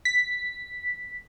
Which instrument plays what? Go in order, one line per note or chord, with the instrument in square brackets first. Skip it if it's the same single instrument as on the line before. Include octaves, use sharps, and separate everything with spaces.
[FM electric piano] B6